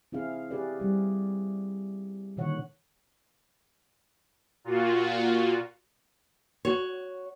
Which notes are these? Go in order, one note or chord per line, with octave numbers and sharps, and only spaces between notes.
C4 E4 G#4 F5
G4 G#4 B4 D5
G3 G4
A#2 D3 D#3 C#5 F#5
A#2 F4 F#4
F#4 C#5